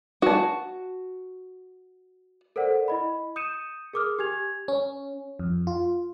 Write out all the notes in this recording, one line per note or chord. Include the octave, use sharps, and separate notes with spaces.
F#4 A5
A4 A#4 C5 D5 F#5
E4 D#5 B5
D#6 G6 C#7 D#7 E7
G#4 A#4 D6 D#6 F6
G4 G#5 G#6 F7
C#4
F2
F4